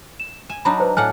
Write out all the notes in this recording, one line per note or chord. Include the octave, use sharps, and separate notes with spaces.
E7
G#5 E7
F#3 D4 D#4 B5
B4 C5
A2 D4 F#5 G#5 F6 F#6